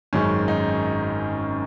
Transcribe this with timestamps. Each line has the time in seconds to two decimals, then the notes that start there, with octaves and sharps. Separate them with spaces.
0.13 G#1 F#2 D#3 G#3 C#4
0.48 D#4